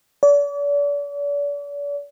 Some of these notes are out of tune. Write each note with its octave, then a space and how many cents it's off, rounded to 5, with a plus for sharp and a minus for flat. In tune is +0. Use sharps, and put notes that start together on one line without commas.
D5 -40